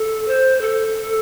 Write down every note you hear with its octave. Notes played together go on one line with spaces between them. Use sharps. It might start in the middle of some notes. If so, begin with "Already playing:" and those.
Already playing: A4
C5
A4